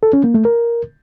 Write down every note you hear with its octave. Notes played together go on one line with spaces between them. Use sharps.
A4
C#4
A#3
A3
A#4